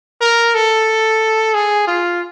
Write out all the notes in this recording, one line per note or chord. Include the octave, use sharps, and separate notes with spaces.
A#4
A4
G#4
F4